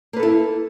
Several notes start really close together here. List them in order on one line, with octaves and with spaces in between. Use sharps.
A#3 B4 A4 E4